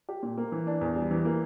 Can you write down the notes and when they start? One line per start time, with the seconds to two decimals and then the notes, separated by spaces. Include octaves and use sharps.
0.09 G4
0.23 A#2
0.38 A#3
0.52 E3
0.67 D4
0.81 E2
0.96 G3
1.11 E3
1.25 A#3